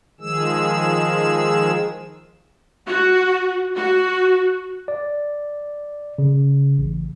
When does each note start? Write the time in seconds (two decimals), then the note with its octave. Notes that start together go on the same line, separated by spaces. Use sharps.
0.21 D#3 F3 G#3 G#4 E6
2.87 F#4
3.76 F#4
4.88 D5
6.18 C#3
6.79 A1